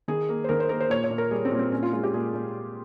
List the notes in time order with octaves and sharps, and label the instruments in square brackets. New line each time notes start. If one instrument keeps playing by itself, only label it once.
[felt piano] D#3 G#4
A#3
C5
D#3 A#4
C5
A#3 A#4
C5
A#2 C#5
C#5
A#2
A#4
G3 G#4
C4
A#2
C4
A#2 C#4
F4
G#3 F4
G4
A#2 G#4
A#2